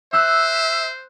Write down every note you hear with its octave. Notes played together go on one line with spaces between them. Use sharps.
C5 E5 E6 F#6